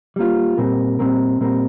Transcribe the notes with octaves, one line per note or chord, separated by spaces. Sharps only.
G3 A#3 F4
A#2 G3 C4 A#4
A#2 G3 C4 A#4
A#2 G3 C4 A#4